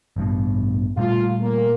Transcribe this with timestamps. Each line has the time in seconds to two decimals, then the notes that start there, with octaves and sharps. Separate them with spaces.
0.16 A1 G2 B2
0.97 A#2 G3 A3 F4
1.42 A#3